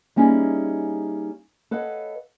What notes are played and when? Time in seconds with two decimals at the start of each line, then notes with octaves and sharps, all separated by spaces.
0.16 G3 A#3 C#4 D#4 E4 G#4
1.71 A4 B4 C#5 D#5 F5 F#5